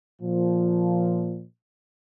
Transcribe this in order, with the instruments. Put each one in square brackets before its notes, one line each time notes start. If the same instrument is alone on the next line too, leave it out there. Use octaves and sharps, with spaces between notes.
[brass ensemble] A#2 F3